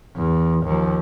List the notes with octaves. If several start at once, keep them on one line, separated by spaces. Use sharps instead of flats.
E2
D#2 F3